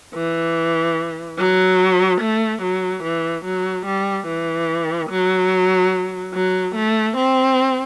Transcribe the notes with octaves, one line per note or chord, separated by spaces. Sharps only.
E3
F#3
A3
F#3
E3
F#3
G3
E3
F#3
F#3
A3
C4